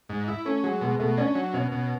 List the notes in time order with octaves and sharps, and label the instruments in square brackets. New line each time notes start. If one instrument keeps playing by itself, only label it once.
[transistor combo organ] G#2
E4
[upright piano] A3 A4 [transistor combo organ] C#4
[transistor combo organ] F#3 [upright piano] G#3 G#4
[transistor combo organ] B2 [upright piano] G#3 G#4
[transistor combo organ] B2 [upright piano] A3 A4
[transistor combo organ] C#4 [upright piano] D4 D5
[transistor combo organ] F#3
[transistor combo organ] B2 [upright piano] C#4 C#5
[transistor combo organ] B2